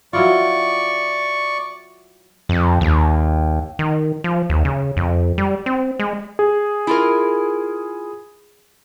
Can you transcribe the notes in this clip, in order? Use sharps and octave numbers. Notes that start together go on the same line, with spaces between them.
F#3 E4 F4 D5 C#6
F2
D#2
D#3
F3
D#2
C#3
F2
G3
C4
G#3
G#4
E4 F4 A#4